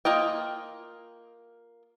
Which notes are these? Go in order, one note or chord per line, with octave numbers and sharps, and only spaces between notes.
A#3 F4 D#5 G5